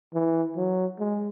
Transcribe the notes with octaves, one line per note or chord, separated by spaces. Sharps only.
E3
F#3
G#3